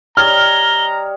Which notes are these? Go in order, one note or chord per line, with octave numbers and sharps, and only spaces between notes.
G3 C#5 D#5 A#5 F6 G7